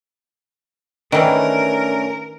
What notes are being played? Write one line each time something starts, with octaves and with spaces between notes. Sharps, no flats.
D#3 E3 A3 C#4 D4 A#4